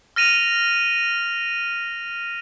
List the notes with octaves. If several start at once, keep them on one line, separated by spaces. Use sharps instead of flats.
F6 A#6 D#7 F7